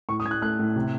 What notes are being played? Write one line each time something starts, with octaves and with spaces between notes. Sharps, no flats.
A2 C#6
D#6
A2 G#6
F#6
A3 F#6
A2
C3